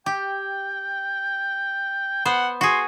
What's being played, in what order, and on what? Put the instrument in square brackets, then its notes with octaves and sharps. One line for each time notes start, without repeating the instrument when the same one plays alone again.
[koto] G4 [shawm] G5
[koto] B3 C5 [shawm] F#5
[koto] F#4 G#4 [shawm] C6